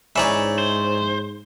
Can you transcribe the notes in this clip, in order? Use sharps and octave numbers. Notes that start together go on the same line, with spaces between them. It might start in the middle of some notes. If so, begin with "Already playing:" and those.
G#2 E3 C#4 D#4 C#5 D5 E5
C5